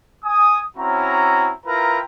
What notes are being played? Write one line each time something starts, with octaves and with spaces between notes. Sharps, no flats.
G#5 D#6
C4 C#4 E4 F#4 A#5
E4 F4 A#4 B4 G5 A#5